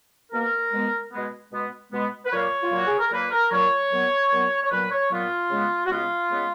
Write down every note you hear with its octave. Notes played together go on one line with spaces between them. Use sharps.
B2 A#3 A#4
B2 G#3 B3
B2 G#3 B3
B2 G#3 B3
B2 G#3 B3
B4
A#2 F#3 A#3 C#5
F4
A#2 F#3 A#3 F#4
G#4
A#4
A#2 F#3 A#3 B4
A#4
A#2 F#3 A#3 C#5
A#2 F#3 B3
A#2 F#3 B3
C#5
A#2 F#3 B3 B4
C#5
A#2 F#3 B3 F4
C#3 G#3 B3
F#4
C#3 G#3 B3 F4
C#3 G#3 B3